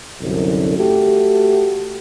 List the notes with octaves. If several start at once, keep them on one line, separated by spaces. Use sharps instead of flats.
C2 F#2 D3
A3 F#4 G4